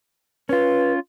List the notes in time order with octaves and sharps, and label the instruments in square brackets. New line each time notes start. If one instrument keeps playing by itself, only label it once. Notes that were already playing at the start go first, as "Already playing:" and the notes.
[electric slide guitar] C#4 F4 [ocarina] B4